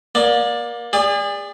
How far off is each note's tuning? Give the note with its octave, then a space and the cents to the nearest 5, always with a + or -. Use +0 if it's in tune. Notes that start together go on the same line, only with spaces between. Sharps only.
A#3 +30 D5 +0
G#4 -40 D5 +0